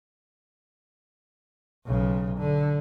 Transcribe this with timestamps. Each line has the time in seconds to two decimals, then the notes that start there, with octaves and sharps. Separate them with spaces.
1.86 B1 C#3
2.39 D3